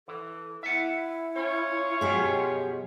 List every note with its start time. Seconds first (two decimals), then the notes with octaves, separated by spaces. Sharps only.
0.08 E3 A4
0.63 E4 E5 F#5
1.35 C#4 F4 C#5
2.01 F#2 B2 F3 F#3 G4 G#4 D#5